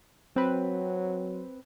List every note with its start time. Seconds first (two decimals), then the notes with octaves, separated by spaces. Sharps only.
0.36 F#3 C4 B4